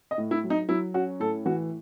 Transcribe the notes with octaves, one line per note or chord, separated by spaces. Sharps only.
D#5
A2
E4
F#3
D#4
F#3 E4
C#4 F#4
A2 A4
E3 F#4